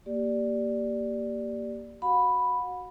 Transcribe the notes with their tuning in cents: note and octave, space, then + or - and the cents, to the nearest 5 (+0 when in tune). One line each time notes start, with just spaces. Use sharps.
A#3 +0 G4 +0 D5 +0
F#4 +0 F#5 -40 B5 +0